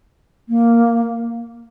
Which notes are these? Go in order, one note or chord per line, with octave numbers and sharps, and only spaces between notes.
A#3